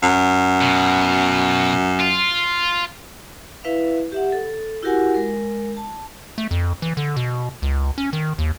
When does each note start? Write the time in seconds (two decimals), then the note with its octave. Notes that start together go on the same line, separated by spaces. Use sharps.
0.03 F#2
0.61 B2
2.00 F4
3.64 E4 B4 E5 F5
4.12 G4 E5 F#5
4.32 A4
4.83 E4 F#4 G4 A#4 F#5 G#5
5.14 G#3 A#4
5.77 A5
6.38 A3
6.51 F2
6.82 E3
6.97 D3
7.16 B2
7.62 C#2
7.98 C#4
8.13 D#3
8.39 D#2